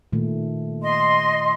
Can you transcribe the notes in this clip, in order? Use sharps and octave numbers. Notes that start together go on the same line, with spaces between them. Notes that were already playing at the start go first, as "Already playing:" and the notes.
A#2 D#3 A3
D#5 C6